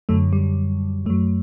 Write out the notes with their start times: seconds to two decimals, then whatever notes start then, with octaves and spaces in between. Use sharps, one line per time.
0.09 F#2 D3 F#3 A3
0.33 G3
1.06 F#2 F#3 A3